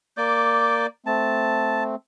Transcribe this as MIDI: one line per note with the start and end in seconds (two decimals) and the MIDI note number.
0.17 0.86 58
0.17 0.86 74
0.17 0.86 86
0.17 0.86 91
1.06 1.96 57
1.06 1.96 60
1.06 1.84 81